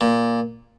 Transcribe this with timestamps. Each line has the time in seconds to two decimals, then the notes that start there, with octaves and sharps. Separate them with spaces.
0.01 A#2